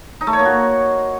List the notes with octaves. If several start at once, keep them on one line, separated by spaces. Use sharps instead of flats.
D#4
A3
C#5
A#3
F#4